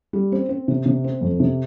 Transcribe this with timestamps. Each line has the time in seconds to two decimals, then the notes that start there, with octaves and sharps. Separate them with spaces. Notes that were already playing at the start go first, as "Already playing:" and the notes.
0.13 G3
0.32 C4
0.49 C4
0.68 C3
0.86 C3
1.04 C4
1.21 F2
1.40 C3